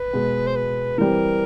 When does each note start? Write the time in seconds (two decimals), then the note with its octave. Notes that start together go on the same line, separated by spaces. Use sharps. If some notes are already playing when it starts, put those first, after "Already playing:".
Already playing: B4
0.13 B2 G#3 B3
0.47 C5
0.56 B4
0.98 E3 G3 C4 A#4